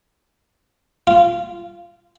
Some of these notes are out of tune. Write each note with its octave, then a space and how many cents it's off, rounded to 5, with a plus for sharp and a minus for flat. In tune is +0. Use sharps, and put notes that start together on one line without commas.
F4 -20